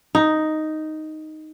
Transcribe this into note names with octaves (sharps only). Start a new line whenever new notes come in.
D#4